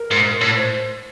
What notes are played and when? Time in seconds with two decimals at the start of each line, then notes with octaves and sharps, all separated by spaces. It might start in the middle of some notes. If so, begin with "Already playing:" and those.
Already playing: A#4
0.11 G#2
0.41 A2
0.56 C5